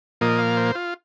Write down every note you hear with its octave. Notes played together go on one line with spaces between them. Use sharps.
A#2 F3 A#3 D#5
F5
C5
F4